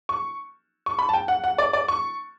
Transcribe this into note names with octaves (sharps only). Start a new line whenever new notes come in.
C#6
C#6
B5
A5
G5
F#5
F#5
D5
D5
C#6